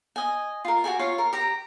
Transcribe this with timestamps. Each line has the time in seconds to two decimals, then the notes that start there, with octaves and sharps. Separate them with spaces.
0.16 D#5 G#5
0.65 F4 A#4
0.84 F#4 G4 A4 G#5
0.99 F4 C#5 F5
1.18 A#4
1.33 G4 A#5